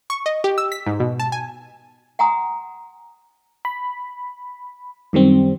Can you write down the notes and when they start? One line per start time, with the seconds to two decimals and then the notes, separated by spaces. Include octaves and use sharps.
0.10 C#6
0.26 D#5
0.44 G4
0.58 E6
0.72 B6
0.86 G#2
1.00 B2
1.19 A5
1.32 G#5
2.19 F#5 G#5 A#5 C6 D#6
3.65 B5
5.13 F#2 D#3 G3 C4